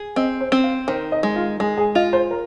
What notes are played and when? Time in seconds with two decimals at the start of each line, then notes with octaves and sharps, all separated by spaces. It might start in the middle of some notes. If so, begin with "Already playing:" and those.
Already playing: G#4
0.16 C4 D#5
0.41 C5
0.52 C4
0.64 F5
0.88 D#3 C5
1.12 D#5
1.23 G#3
1.36 F4
1.60 G#3 G#4
1.78 G#4
1.95 F4 D#5
2.13 C5
2.31 A#4